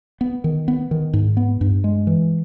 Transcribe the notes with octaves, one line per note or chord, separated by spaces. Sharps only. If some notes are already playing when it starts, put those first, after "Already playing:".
B3
D#3
B3
D#3
G#2
B3
G2
G#3
E3